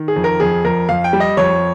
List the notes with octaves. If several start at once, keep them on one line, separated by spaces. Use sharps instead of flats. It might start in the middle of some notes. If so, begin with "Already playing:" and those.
Already playing: D#3
G#4
F2
A#4
F2 G#4
F2 A#4
F2 F5
G5
G3
D#5
F2 C#5